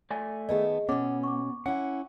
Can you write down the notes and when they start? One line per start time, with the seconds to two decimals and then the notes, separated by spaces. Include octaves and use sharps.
0.11 A3 D5 G#5
0.49 D#3 B3 G#4 D#5 A5
0.89 B2 B3 C#4 D6
1.24 C#6 D6
1.66 C#4 E4 F#5